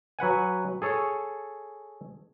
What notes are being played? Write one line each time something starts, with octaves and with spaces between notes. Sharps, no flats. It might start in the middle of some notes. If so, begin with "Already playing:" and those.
F#3 B4 F#5 G#5
G#4 A4 C#5